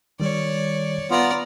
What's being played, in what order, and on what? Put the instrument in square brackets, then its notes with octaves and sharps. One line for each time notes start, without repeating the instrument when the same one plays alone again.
[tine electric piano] D#3 G3 [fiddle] C#5 D5
[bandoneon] B3 F4 [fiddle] D5 A#5